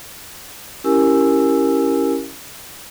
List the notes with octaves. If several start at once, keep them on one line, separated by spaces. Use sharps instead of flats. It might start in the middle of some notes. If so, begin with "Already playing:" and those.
C#4 E4 G4 A#4 G#5 E6